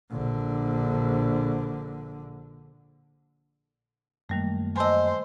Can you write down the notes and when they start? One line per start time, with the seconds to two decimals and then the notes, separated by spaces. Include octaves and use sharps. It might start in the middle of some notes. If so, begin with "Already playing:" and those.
0.11 A#1 D3
4.29 F#2 D#3 G3 A3 A#3
4.76 E2 C5 D#5 G#5 A5 E6